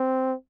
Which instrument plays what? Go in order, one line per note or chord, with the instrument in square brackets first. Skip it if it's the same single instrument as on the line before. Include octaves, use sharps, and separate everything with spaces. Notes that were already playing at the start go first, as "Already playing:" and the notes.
Already playing: [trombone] C4